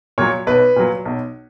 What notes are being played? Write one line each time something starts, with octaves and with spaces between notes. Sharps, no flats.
A#2 F#3 C#5
B1 B4
A#2 F#3
B1